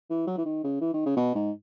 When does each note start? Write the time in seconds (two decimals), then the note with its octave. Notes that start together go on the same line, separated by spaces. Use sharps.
0.10 E3
0.27 F#3
0.37 E3
0.45 D#3
0.64 C#3
0.81 E3
0.93 D#3
1.06 C#3
1.16 B2
1.35 G#2